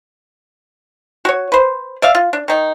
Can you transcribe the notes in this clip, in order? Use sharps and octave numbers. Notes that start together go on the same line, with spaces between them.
F#4 C#5
B4 C5
D5 E5 F5
F4
D4
D#3 D#4